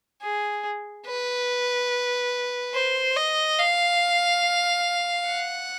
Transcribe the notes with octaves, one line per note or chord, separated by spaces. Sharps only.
G#4
B4
C5
D#5
F5
F#5